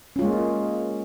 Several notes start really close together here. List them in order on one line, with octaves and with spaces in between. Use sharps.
C#4 F4 G#3 A#3